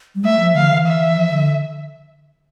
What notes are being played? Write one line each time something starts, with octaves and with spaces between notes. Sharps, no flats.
G3
A3 E5
F3
D3 F5
E3
E5
E3
F3
D3